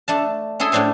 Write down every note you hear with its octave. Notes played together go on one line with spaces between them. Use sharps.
A3 D4 A5
C#4 E4 G#4 A4 G#5 C6
A2 C#4 D4 C5 G#5